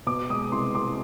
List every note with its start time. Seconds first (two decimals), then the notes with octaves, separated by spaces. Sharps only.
0.07 B2 D6
0.30 G#3 D#6
0.52 C2 C6
0.75 C2 D6